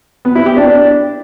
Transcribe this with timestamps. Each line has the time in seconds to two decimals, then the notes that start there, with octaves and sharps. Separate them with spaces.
0.25 B3
0.35 E4
0.46 G4
0.57 D4
0.67 D4